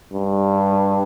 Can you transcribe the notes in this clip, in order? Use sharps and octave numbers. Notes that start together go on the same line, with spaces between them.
G2